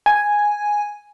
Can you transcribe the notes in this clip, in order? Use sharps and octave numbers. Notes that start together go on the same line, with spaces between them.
G#5